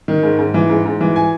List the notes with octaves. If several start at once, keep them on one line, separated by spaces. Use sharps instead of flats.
D#3
G#2
G#2
E3
G#2
G#2
E3
G#5